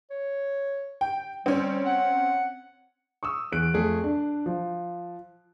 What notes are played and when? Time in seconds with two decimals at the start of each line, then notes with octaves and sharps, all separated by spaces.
0.11 C#5
1.01 G5
1.46 G3 C4 C#4
1.86 F#5
3.23 C#6 D#6 E6
3.52 E2 G#4 F#6 D7
3.74 F2 A3 G#4
4.04 D4
4.46 F3